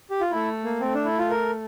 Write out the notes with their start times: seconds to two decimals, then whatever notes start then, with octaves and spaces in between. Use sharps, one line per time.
0.11 G4
0.21 F4
0.32 A3 E4
0.64 A#3
0.81 A3 C4
0.94 D4
1.05 E4
1.19 F4
1.30 A#4